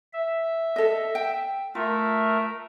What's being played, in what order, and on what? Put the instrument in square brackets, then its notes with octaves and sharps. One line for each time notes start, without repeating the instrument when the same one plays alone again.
[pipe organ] E5
[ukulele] A4 D#5
G5
[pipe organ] A3 A#4 E5 [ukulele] F4